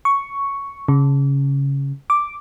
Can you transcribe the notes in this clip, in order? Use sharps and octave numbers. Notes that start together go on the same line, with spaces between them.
C#6
C#3
D6